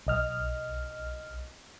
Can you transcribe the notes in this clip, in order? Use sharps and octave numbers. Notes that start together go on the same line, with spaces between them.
B1 D#5 F6